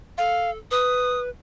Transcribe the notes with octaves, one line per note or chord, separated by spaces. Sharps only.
A4 F5
B4 D#6